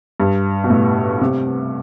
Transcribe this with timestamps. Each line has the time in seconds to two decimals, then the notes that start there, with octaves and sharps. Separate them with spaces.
0.20 G2
0.64 B2
0.70 A2
1.21 C3